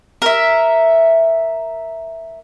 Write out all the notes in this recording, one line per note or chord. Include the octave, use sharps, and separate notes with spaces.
A#4 E5